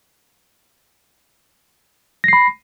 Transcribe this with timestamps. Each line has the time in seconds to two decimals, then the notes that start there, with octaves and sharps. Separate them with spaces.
2.24 A#6
2.28 C7
2.33 B5